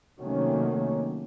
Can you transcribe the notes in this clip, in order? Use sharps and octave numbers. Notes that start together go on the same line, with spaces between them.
C3 D#3 F#3 A3 A#3 C#4